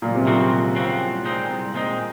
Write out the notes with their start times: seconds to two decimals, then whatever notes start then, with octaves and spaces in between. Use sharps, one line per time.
0.02 C#2 A#2
0.15 C3
0.27 A#2 C#3 F3 C4 F#4
0.51 C#2
0.76 C#3 F3 C4 F#4
1.01 C2
1.25 A#2 G#3 C4 D#4
1.50 C2
1.74 A#2 G#3 C4 D#4